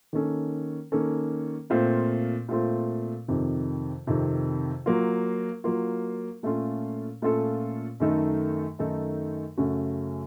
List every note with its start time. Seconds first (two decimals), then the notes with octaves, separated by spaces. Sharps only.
0.13 D#3 A#3 C#4 A4
0.92 D#3 A#3 C#4 A4
1.70 A#2 A3 C4 F4
2.48 A#2 A3 C4 F4
3.28 F2 C3 D#3
4.07 F2 C3 D#3
4.86 F#3 A#3 F4
5.64 F#3 A#3 F4
6.43 A#2 A3 C#4 F4 A4
7.22 A#2 A3 C#4 F4 A4
8.00 F#2 D#3 A3 D#4 A4
8.79 F#2 D#3 A3 D#4 A4
9.57 F#2 C#3 A3 C#4 F#4